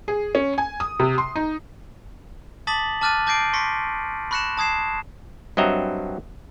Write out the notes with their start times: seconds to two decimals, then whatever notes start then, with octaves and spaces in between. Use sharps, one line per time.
0.08 G#4
0.35 C#4
0.58 G#5
0.80 D#6
1.00 C3
1.18 C6
1.36 D#4
2.67 A5 D6 D#6 A6 B6 F#7
3.01 A5 D6 F6 F#6 A6 D#7
3.26 A5 D6 G6 A#6 C7 D7
3.53 C6 C#6 A#6 B6 C#7
4.31 B5 C#6 F#6 A#6 C#7 E7
4.57 A5 D#6 G#6 C7 E7
5.57 G2 F#3 C4 D#5 E5 A#5